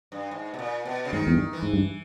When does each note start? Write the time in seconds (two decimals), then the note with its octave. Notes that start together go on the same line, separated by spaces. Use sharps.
0.12 G2
0.31 G#2
0.54 B2
0.59 A#2
0.86 B2
1.05 C#3
1.13 G#2 D#3
1.27 E2
1.33 G2
1.53 E3
1.63 G#2
1.73 G2